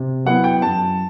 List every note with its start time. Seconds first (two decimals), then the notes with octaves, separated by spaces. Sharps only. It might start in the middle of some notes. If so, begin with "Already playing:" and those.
Already playing: C3
0.25 F#3 B3 E4 F#5
0.44 G5
0.62 F#2 A5